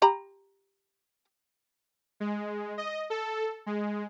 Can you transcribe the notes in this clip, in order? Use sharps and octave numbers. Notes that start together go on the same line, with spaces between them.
G4 A#5 B5
G#3
D#5
A4
G#3